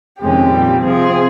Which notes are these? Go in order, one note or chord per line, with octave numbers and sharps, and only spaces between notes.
F2 C3 D#3 G#3 C#4 G4
A#2 G3 C4
C3 F3 C4 G#4